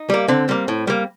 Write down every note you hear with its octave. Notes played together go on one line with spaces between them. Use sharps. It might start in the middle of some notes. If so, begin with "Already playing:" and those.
Already playing: D#4
G3 A#3
D3 C4
G3 A#3
A2
G3 A#3